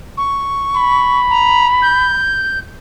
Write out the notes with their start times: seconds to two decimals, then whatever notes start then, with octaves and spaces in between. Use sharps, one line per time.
0.17 C#6
0.76 B5
1.30 A#5
1.82 G6